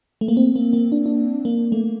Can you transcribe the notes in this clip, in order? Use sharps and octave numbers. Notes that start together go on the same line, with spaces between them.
A3
A#3
C4
A#3
A#3
D4
D4
A#3
A3